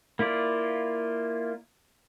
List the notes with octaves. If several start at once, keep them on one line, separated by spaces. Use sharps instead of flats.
A#3 E4 F4 D5